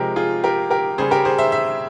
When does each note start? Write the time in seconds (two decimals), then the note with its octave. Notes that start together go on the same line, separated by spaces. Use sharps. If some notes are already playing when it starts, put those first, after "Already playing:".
Already playing: C3 F3 G#3 G4 A#4
0.16 F4 G#4
0.44 G4 A#4
0.71 G4 A#4
0.98 C#3 G3 G#4 C5
1.11 G4 A#4
1.25 G#4 C5
1.38 C5 E5
1.52 E5